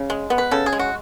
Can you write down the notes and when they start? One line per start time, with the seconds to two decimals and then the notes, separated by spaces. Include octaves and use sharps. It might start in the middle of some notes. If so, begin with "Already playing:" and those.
Already playing: C#3
0.10 G#3
0.30 B3
0.38 B4
0.51 C#3 A4
0.66 G#4
0.73 G#3
0.79 F#4